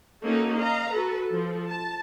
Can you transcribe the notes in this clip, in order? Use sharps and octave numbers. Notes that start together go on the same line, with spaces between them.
A#3 C#4 D#4 F#4 A4
D#5 F5 A#5
F#4 A4 B4
F3 A4
A5